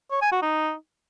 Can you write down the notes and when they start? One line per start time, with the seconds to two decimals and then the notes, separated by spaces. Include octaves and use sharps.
0.12 C#5
0.22 G#5
0.32 F#4
0.42 D#4